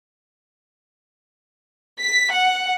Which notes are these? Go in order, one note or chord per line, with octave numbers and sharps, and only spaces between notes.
B6
F#5